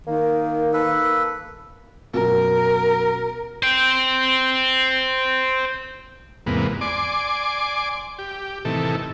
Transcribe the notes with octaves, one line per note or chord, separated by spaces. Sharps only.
D#3 A#3
A#3 A4 B4
F#2 B2 A#4
C5 G5
E2 G#2 C3 A#3 B3
D5 G#5 C6 D6
G4
A2 C3 D#3 E3 A4